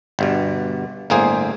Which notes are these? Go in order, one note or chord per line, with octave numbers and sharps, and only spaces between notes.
G1 G2 B2
G1 A2 A#3 G#4 C5 G#5